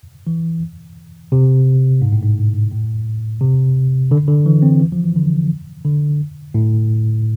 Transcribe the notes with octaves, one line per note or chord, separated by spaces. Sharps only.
E3
C3
G#2
A2
G#2
A2
C3
D3
D3
E3
C4
E3
F3
E3
D3
D3
A2